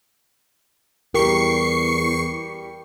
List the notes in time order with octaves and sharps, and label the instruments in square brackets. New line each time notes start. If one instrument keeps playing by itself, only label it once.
[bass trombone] E2 [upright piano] G3 G4 [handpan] A#4 [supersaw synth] C#6 C7 C#7